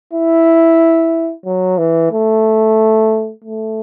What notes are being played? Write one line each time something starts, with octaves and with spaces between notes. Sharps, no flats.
E4
F#3
E3
A3
A3